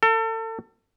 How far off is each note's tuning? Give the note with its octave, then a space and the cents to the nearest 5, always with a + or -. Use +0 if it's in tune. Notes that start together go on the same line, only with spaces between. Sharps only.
A4 +35